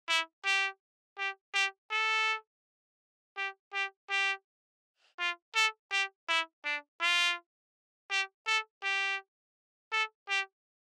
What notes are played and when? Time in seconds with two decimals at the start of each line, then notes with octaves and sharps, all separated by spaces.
0.09 E4
0.45 G4
1.18 G4
1.55 G4
1.91 A4
3.37 G4
3.74 G4
4.10 G4
5.19 F4
5.55 A4
5.92 G4
6.29 E4
6.65 D4
7.01 F4
8.11 G4
8.47 A4
8.83 G4
9.92 A4
10.29 G4